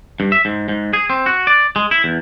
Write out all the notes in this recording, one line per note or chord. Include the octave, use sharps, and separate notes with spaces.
G2
E5
G#2
G#2
G#4
C4
F#4
D5
G#3
E4
E2